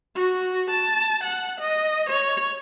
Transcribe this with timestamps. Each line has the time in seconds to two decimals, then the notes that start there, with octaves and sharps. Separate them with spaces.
0.15 F#4
0.70 A5
1.23 F#5
1.60 D#5
2.09 C#5